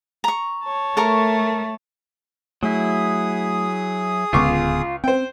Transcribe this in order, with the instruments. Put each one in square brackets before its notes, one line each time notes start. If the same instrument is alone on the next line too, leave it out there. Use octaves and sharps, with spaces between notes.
[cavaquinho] A#5 C#6
[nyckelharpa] C#5 A5
[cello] A3 [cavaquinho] A4 A#4 C#6
[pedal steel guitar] F#3 E4 [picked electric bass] A3 [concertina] G#4 D#6
[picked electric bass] D1 D3 B3 [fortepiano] C#2 C#6 D6 [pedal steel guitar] F4
[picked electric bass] C4 [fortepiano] C5 G5